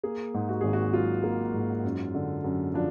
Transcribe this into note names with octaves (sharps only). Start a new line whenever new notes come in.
A#3 G#4
G#2
F#4
G#1 G#4
F#4
F#3 F4
A#3
G#2
F#2
D3
F#2
F3 D4